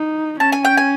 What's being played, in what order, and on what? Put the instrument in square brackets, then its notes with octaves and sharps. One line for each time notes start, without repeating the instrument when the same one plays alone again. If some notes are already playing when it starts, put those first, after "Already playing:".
Already playing: [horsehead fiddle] D#4
[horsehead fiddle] C#4 [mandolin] A5
[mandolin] G#5
G5
G#5